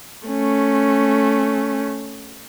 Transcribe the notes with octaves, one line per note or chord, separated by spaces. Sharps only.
A3 C#4